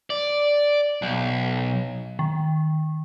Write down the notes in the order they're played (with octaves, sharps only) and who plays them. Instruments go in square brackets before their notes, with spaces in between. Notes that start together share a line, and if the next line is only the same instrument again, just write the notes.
[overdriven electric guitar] D5
B1
[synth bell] D#3